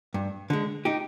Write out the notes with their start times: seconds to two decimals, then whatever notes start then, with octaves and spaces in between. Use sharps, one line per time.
0.14 G2
0.50 D3 G#3
0.85 D#4 G4